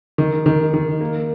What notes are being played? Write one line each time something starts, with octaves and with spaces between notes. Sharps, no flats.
D#3
D#3
D#3
A#3